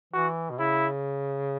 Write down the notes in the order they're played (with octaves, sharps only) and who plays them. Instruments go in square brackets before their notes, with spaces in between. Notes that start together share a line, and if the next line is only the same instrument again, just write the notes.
[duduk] E3 [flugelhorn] F#4
[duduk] B2
[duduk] C#3 [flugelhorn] E4